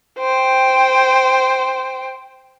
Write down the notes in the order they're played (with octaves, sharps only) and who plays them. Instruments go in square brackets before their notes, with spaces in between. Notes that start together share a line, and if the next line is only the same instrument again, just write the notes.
[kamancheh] C5 G5